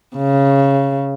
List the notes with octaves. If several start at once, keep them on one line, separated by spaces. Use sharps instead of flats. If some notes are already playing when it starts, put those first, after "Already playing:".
C#3